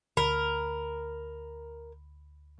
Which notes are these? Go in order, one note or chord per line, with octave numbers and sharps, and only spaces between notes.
D2 A#4 B5